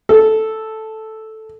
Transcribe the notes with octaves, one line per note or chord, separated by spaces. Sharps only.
A4